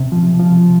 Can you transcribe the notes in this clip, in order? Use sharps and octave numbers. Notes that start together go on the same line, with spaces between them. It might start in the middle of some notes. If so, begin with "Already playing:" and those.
Already playing: C3
F3
F3